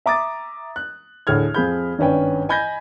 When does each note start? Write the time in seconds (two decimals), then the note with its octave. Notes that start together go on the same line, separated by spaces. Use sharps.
0.06 E5 A#5 D6 D#6 A6
0.76 F#6
1.27 D2 A2 G#4 F6 G#6
1.54 F2 F3 G#4 B5 G6
1.99 G#1 G2 C#4 B4 G5
2.49 D#5 G#5 B5 G6 G#6 A#6